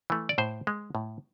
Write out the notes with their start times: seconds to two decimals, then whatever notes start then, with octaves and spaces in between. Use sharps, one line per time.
0.10 E3 A3
0.29 D5
0.38 A2 C5
0.67 G#3
0.95 A2